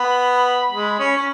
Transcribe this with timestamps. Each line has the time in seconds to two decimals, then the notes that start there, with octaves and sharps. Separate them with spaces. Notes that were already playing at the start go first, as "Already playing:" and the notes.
Already playing: B3 B5
0.72 G#3
0.99 C#4
1.17 C#4